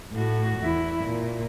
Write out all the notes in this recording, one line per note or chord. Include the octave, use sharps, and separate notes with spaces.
A2 F#4
E2 E4
A#2